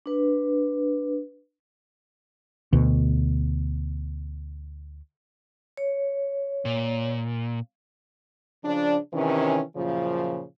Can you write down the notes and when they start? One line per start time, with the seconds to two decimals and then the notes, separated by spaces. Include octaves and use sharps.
0.06 D4 B4
2.73 D2 B2
5.77 C#5
6.65 A#2
8.64 C#3 F3 D4
9.14 C3 D#3 E3 C#4
9.77 F#2 A#2 C#3 F3